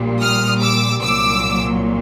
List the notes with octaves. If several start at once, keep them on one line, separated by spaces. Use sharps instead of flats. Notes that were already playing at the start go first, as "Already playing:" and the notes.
Already playing: A#1 A#2 G3
D#6 F6
D6 E6
C2 A#2 F#3 D6 E6